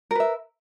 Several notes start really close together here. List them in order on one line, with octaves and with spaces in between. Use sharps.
A#4 B4 E5